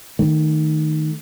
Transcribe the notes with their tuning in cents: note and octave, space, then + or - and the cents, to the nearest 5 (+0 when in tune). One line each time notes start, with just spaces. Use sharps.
D#3 -5 A3 +5